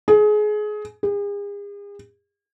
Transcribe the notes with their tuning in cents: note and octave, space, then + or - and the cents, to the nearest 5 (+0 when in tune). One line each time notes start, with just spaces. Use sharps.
G#4 +25
G#4 -40